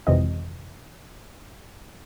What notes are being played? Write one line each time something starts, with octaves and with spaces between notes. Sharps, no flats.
G#1 F2 C3 E3 C4 D#5